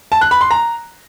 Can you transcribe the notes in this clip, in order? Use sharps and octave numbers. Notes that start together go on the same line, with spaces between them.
A5
F#6
B5
C6
A#5